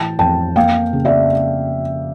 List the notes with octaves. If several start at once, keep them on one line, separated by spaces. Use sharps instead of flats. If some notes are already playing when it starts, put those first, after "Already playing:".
Already playing: A2 E3 G5 A5
F2 G5 A5
A#3 F5 G5
C#3
D5 E5